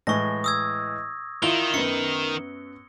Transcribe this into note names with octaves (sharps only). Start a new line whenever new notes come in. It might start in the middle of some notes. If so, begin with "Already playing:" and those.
A2 E3 G#3 C#6 A#6
D#6 E6 G#6
D#3 E4 F4 G7
F#2 B3 C#7